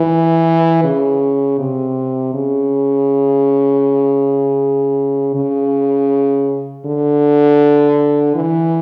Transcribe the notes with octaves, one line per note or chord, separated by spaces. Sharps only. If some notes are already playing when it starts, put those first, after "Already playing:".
Already playing: E3
C#3
C3
C#3
C#3
D3
E3